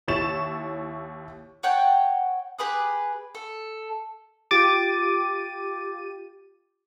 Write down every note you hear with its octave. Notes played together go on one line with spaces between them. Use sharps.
D#2 E4 C#5 C#6 A6 E7
C#5 F#5 G5 A5
G4 G#4 B4 D#6
A4
F4 G4 D6 A6 D#7